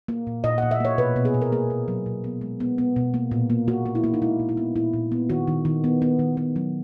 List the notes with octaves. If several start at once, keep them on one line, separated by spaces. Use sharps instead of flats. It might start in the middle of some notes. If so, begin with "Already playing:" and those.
A#3
A#2
A#2 D#5
F#5
A#2
E5
A#3 C#5
B2 B4
B2
G#4
B2
A#4
A#3 G#4
B2
F#3
B2
B3
G#3
B3
B3
B2
A#3
A#2
A#3
A#3 F#4
A#3
E4
A#3
D#4
G#3 E4
A#2
E4
B3
A#2 E4
A#2
B3
D#3 F#4
D#3
D#3
B3
B3
D#3
B3
F#3